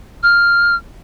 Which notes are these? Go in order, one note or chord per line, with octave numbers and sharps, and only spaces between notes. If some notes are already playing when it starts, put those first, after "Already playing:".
F6